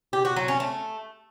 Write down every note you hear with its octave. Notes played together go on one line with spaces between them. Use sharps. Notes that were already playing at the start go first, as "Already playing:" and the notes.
G4
F#4
F#3
C#4
A3